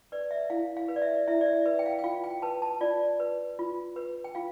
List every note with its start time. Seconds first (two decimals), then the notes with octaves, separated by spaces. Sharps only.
0.12 B4 D5
0.31 E5
0.50 E4 F5
0.77 F5
0.88 B4
0.96 D5
1.02 E5
1.28 E4 E5
1.41 D5
1.46 E5
1.65 B4 E5
1.79 G5
1.86 F5
1.99 G5
2.04 F4 F5
2.24 G5
2.42 B4 A5
2.62 A5
2.81 F4 D5
3.20 B4
3.59 F4
3.96 B4
4.24 G5
4.35 F4 F5